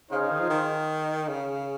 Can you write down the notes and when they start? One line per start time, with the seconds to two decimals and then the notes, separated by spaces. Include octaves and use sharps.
0.10 C#3 D#4 G#4 C5 F5
0.21 C#3
0.31 D#3
0.40 F3
0.50 D#3
1.28 C#3